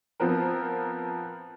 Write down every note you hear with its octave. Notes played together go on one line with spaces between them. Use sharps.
F3 B3 C4 A#4